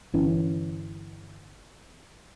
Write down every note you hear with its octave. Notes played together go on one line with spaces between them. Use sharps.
G1 E3 C#4